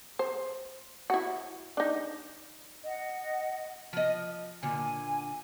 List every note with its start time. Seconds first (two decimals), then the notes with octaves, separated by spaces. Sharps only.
0.19 C5
1.10 E4 F#4
1.77 D4 D#4
2.84 D#5 F#5
3.93 F3 D#5
4.63 A#2 D3 G#5